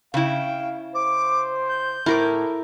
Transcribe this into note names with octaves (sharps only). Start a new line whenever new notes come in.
C#3 E4 F5 G5
C5 D6
G6
A2 E4 A#4 D6